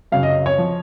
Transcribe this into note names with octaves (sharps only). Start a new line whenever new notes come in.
F#2 C#3 F#3 F5
D#5
C#5
F3